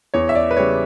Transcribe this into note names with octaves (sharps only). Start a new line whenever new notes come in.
E2 C#5
E5
D5
B4
C#3 G3 C#5